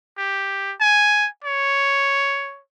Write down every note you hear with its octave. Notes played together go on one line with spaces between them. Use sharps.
G4
G#5
C#5